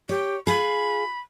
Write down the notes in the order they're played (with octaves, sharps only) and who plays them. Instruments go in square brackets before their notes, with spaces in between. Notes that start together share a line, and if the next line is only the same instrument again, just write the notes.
[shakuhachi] G4 [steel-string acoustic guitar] C#5
[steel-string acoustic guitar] F4 G#4 [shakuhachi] B5